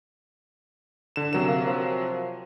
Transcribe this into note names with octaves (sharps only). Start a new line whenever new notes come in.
D3 E7
F#2 C3 F#3 E7
A#3
F3